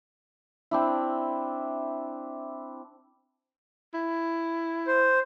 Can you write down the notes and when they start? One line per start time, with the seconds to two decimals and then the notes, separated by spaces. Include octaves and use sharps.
0.71 C4 D4 E4
3.94 E4
4.87 C5